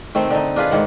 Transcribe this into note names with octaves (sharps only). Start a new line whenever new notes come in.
D#3 A3 C4
D3 D#4
D4 F4 G#4 B4
G#2 D#3 F#5